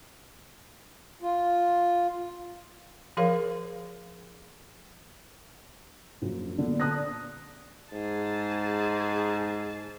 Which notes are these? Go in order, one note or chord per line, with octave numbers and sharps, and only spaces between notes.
F4
F3 G#4 A#4 C#5 F5
A#1 F#2
A#2 D3 B3
D5 A5 D#6 F#6 A#6
G#2 G#4 A5